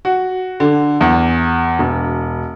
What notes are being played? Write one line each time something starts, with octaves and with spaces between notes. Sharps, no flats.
F#4
D3
E2
E1